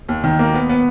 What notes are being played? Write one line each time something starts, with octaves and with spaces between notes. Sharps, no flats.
D#2
D#3
A#3
B3
B3